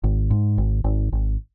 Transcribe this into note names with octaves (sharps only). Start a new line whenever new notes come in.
G#1
G#2
G#1
G#1
G#1